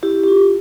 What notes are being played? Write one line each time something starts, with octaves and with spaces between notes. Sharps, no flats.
E4 G4
G4
F4